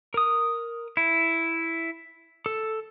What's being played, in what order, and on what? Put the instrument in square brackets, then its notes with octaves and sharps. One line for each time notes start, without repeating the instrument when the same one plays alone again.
[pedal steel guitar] A#4 D#6
E4
A4